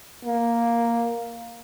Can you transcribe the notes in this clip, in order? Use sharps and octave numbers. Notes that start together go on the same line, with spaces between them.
A#3